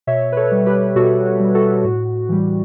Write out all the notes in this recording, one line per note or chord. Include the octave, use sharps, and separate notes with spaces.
B2 C#5 E5
B4
A4 C#5
G3
G4 B4
B2 F#4 A4
G3
F#4 A4
A2 F#4
E3 G3